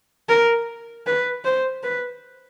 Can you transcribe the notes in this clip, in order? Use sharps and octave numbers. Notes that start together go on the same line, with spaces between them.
A#4
B4
C5
B4